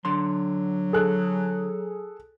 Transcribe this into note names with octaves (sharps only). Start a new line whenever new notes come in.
D3 F#3 C6
G#4 A4 F#6